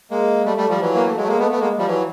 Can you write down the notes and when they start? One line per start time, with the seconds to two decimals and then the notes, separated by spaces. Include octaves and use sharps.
0.11 G#3 A#3
0.46 G3 A3
0.57 G3 A3
0.69 F3 G3
0.81 E3 F#3
0.95 A#3
1.05 A3
1.17 F#3 G#3
1.23 A3
1.28 G#3 A#3
1.39 A3 B3
1.51 A3 B3
1.60 G#3 A#3
1.78 F3 G3
1.87 E3 F#3